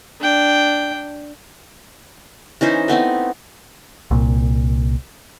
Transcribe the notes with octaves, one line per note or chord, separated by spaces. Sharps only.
D4 G5
E3 C#4 D#4 C5
A3 B3 C4 D#4
C2 A#2